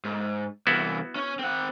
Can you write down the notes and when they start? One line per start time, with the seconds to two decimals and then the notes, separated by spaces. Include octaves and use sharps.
0.05 G#2
0.67 C2 E3 B3 E4 F#4
1.16 C#4 C#5
1.39 C4 F#5